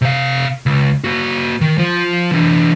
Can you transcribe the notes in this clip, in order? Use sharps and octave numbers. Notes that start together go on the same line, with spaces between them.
C3 F5
C#2
A#3 F#4
D#3
F3 F4
E3 D4